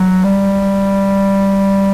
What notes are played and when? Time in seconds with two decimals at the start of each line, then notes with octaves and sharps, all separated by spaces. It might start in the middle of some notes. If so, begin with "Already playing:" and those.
Already playing: F#3
0.24 G3